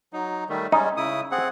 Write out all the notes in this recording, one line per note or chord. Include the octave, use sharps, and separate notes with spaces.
F#3 D#4
D#3 G3 A3
G3 G#3 C#4 D#4
C#3 E4 D#6
C4 G#4 F#5